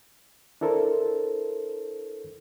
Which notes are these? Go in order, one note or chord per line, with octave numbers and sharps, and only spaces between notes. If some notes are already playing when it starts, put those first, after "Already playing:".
D4 E4 A4 A#4 C5